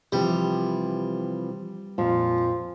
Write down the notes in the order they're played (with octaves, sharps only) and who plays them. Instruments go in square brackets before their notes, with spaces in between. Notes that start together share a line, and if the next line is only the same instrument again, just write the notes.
[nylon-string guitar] C3 E3 F3 [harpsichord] G3
[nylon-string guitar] F2 A#2 [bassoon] F3